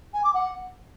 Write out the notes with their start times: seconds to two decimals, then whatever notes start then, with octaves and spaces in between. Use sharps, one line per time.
0.13 G#5
0.24 D6
0.34 F#5